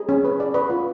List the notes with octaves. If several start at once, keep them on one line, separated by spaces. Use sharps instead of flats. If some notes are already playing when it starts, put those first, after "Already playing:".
Already playing: G#4
C#4
B4
D5
B4
F4